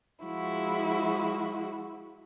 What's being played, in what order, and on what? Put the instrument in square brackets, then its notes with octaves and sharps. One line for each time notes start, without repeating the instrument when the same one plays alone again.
[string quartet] F3 G#3 E4 F#4